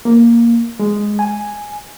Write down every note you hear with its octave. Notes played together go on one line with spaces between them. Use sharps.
A#3
G#3
G#5